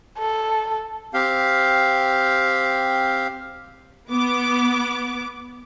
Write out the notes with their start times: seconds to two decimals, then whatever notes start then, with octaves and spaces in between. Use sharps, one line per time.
0.19 A4
1.14 C4 G4 F5
4.10 B3 D6